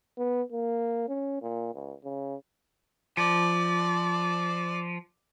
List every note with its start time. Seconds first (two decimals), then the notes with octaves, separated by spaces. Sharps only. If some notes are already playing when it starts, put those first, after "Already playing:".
0.18 B3
0.52 A#3
1.08 C#4
1.42 A#2
1.74 C#2
2.04 C#3
3.17 F3 D5